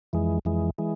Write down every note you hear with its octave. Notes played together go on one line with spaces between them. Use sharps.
F2 E3 G#3
F2 E3 G#3
E3 G#3